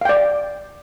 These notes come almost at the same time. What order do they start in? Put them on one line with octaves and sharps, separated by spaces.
F5 G5 D5